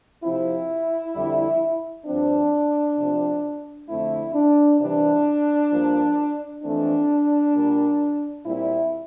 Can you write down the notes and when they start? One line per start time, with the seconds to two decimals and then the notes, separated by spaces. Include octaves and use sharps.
0.24 C3 F3 C4 E4
1.15 F2 D3 G3
2.06 G2 F3 C4 D4
2.98 C3 F3 C4
3.89 F2 D3 A3 C4 E4
4.35 D4
4.80 C3 E3 G3 D4
5.72 G2 F3 A#3
6.63 F2 E3 A3 C4 D4
7.55 A#2 G3 A#3
8.46 A#2 G3 C4 E4